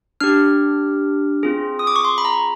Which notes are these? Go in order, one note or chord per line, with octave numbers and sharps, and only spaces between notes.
D4 G4 F6
C4 F4 G#4
D#6
D6
C#6
C6
B5
A#5